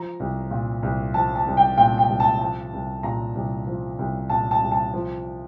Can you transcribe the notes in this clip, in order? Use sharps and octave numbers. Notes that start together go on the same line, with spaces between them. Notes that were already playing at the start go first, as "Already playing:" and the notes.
Already playing: F3 A#5
C2
A#2
C2
F3 A5
A5
C2
G5
A#2 G5
G5
C2
A5
F3 A5
C2
A#2 A#5
C2
F3
C2
A#2 A5
A5
C2
A5
F3